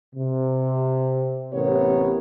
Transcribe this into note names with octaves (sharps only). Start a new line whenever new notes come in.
C3
A1 C3 B3 G4 A#4 C#5